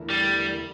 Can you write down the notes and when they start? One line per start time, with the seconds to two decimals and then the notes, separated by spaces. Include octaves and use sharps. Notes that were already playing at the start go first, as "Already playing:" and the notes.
Already playing: E2 D3 A3 E4 A#4
0.10 G3